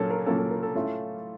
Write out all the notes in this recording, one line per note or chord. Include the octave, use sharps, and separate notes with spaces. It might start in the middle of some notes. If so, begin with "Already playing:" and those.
Already playing: A#2 F#3 A#3 C#4 A4 A#4
A#4
A#2 F#3 A#3 C#4 A4
A4
A#4
A4
A2 A3 C#4 F4